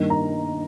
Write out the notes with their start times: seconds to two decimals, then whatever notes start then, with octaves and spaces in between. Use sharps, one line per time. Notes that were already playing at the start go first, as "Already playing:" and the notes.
Already playing: G2 D#3 A#3
0.10 A#5